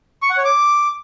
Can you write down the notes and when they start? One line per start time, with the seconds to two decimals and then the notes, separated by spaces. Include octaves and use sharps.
0.22 C#6
0.30 F#5
0.37 C#5
0.45 D6